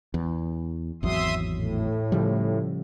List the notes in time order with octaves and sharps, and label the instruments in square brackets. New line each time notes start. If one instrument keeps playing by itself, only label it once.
[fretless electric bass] E2
[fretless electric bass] G#1 E2 F#3 [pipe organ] E5 C6 D#6
[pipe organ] A2
[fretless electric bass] C#3 F3 G3